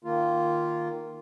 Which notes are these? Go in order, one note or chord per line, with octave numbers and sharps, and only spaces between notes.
D#3 A#3 F4